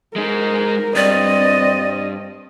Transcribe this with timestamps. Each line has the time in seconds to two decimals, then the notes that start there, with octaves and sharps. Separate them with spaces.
0.16 G#3 D#4 A#4
0.96 G2 C4 D5 D#5